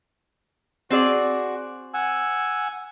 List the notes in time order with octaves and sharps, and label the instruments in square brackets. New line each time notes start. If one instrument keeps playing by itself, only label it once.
[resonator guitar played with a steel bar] C4 G#4 D5 [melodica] F#4
[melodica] F#5 G#5 E6